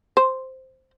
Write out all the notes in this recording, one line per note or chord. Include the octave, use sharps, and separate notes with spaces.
C5